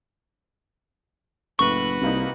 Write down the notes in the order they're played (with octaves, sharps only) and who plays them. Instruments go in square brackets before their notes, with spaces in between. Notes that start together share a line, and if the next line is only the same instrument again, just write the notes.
[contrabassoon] F#1 [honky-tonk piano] A2 [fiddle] F#4 B4 [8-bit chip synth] C#6
[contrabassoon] C2 [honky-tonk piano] C3 A#3 D#4